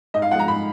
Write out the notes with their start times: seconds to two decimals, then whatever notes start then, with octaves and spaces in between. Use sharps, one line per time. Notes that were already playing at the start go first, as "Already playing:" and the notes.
0.14 G#2 D#5
0.22 F5
0.31 F3 F#5
0.35 G#3 A#5
0.47 G#2 B5